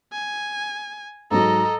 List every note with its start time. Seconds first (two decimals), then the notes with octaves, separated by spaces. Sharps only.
0.12 G#5
1.31 G#2 F#3 A4 D#5 A#5